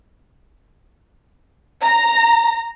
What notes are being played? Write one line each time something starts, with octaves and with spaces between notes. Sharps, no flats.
A#5